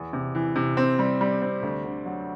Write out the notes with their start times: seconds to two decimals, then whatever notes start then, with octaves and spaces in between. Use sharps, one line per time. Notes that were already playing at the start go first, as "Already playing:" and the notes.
Already playing: E2
0.13 C3
0.35 E3
0.56 C3
0.77 C4
0.99 G3
1.21 G3
1.42 C4
1.62 D2
1.85 D3
2.06 F#3